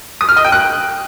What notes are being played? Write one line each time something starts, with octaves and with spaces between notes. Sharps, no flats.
D#6
F6
D#5
G5
F#6